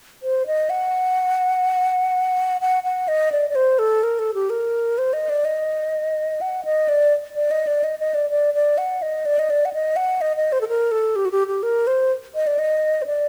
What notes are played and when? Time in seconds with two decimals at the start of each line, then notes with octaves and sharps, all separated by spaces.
0.23 C5
0.47 D#5
0.70 F#5
2.61 F#5
2.84 F#5
3.08 D#5
3.32 D5
3.50 D5
3.55 C5
3.79 A4
4.03 A#4
4.19 A4
4.34 G4
4.50 A#4
4.98 C5
5.13 D#5
5.29 D5
5.45 D#5
6.41 F#5
6.65 D#5
6.89 D5
7.35 D5
7.51 D#5
7.67 D5
7.84 D#5
8.00 D#5
8.14 D5
8.31 D5
8.54 D5
8.78 F#5
9.02 D#5
9.26 D5
9.39 D#5
9.50 D5
9.65 F#5
9.73 D#5
9.96 F#5
10.21 D#5
10.37 D#5
10.52 C5
10.61 A4
10.69 A#4
10.91 A4
11.16 G4
11.25 F#4
11.31 G4
11.48 G4
11.63 A#4
11.87 C5
12.35 D#5
12.47 D5
12.59 D#5
13.02 C5
13.06 D5